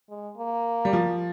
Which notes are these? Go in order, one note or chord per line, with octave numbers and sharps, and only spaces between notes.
G#3
A#3
G3
F3